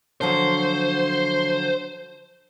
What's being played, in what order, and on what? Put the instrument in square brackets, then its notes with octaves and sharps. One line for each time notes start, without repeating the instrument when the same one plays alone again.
[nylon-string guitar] D3 F3 F#3 [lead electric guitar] C5